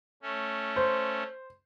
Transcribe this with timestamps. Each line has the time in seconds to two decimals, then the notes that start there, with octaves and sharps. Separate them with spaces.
0.23 A3 C#4
0.76 C5